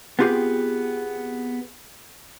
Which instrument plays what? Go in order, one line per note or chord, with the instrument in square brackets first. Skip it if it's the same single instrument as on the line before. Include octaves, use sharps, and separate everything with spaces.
[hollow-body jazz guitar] B3 C4 F4 G4 G#4